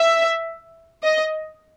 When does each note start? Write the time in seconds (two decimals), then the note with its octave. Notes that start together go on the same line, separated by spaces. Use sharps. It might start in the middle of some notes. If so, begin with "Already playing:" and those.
Already playing: E5
1.03 D#5